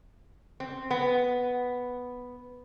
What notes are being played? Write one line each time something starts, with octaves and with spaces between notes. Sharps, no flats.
C4
B3